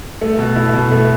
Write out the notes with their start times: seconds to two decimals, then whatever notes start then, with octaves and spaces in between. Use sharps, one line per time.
0.21 A3
0.38 B2
0.56 E4
0.73 B2
0.91 A3